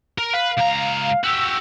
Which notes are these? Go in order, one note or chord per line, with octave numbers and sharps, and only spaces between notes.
A#4
B4 F5
C#2 A#5
F#4 G4 E6